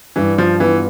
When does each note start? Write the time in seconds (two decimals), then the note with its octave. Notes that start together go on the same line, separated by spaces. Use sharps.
0.16 G2 E3
0.38 F3 F4
0.60 E3 B3